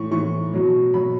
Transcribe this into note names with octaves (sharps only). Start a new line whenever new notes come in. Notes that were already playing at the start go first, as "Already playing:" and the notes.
Already playing: A2 E3 C#6
A2 E3 C#6
B2 F#3
B2 F#3 B5